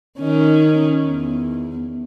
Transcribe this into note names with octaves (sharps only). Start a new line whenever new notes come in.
D#3 C#4 D#4
E2